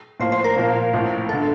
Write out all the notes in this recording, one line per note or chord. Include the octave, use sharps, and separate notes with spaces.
A2 F3 A#3 C5
C5
A#4
A#2 F3 A#3
A1 A2 F3
G1 D3 A4